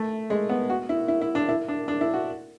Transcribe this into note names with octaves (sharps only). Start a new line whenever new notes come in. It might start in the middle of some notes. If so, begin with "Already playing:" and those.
Already playing: A3
G#3
B3
F#4
E4
E4
E4
D4
E4
D4
D4
E4
F#4